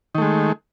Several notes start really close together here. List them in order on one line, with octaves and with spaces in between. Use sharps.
D#3 A3 G#3